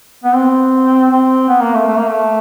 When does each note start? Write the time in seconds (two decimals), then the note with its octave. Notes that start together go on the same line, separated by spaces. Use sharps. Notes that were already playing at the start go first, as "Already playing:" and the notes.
0.23 B3
0.34 C4
1.11 C4
1.48 B3
1.61 A#3
1.74 A3
1.87 A3
1.97 A#3
2.08 A3